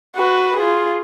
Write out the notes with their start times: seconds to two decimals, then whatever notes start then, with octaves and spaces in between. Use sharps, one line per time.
0.16 F#4 B4
0.57 F4 G#4